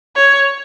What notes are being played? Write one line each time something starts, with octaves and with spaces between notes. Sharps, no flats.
C#5